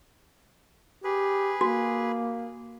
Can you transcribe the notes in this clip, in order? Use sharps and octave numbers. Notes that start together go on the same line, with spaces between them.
G4 G#4 B4
A#3 F#4